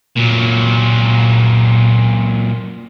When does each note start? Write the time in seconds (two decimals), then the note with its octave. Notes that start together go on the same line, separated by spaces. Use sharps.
0.17 A#2 F#3